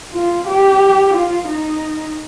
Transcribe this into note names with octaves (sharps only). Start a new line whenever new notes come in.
F4
G4
F4
D#4